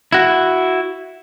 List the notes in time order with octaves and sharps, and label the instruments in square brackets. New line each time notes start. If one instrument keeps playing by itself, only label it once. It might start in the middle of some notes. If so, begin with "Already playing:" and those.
[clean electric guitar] E4 F#4